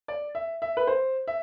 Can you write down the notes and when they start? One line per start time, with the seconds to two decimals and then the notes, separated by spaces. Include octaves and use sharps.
0.08 D5
0.35 E5
0.62 E5
0.77 B4
0.87 C5
1.28 E5